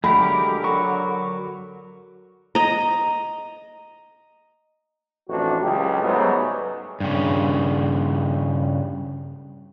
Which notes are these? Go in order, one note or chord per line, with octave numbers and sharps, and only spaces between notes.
D3 F#3 G#3 A3 G4 A#4 B5
F#3 A#4 C#6
D#5 A#5
A1 F2 D4 F#4
C#2 C#3 F#3 G4
G#2 F#3 G3 A3 B3
G2 C#3